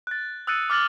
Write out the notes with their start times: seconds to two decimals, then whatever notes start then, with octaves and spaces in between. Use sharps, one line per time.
0.07 F#6 A6
0.47 D#6 E6 F#6 A6 C#7 D#7
0.70 D6 F6 A6 F#7